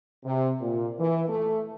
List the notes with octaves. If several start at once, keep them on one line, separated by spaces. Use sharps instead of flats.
C3
A#2
E3
A3